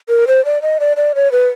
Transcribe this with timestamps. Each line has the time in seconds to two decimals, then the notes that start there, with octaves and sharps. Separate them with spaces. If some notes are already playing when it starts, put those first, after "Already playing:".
0.09 A#4
0.28 C5
0.45 D5
0.62 D#5
0.80 D5
0.97 D5
1.15 C#5
1.32 B4